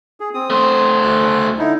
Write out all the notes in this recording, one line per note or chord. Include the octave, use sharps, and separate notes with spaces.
G#4
C4 D#6
A3 C5
D2 F#6
D3 D#4 E4